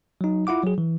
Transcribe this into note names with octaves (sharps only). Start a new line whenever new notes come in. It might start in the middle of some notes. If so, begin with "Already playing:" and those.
F#3 D#4
E4 F4 F#5 D6
F#3 G#4
E3